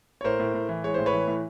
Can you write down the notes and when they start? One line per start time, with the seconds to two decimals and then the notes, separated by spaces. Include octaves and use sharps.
0.21 C#5
0.24 A2 A#4 C5
0.39 A2
0.54 A2
0.69 E3
0.84 G#3 C#5
0.94 A2 C5
1.06 B4 C#5
1.13 E3
1.27 A2